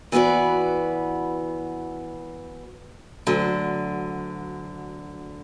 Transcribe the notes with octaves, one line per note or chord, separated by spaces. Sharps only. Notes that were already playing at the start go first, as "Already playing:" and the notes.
E3 B3 F#4 B4 D5
D2 D3 F#3